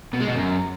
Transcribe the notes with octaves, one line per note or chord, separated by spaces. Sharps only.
B2
G#3
B2
F#2